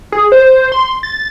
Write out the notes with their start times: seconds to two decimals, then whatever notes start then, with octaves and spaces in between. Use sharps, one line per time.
0.12 G#4
0.32 C5
0.72 C6
1.03 A6